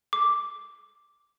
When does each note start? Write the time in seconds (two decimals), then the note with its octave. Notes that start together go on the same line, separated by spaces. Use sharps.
0.13 D6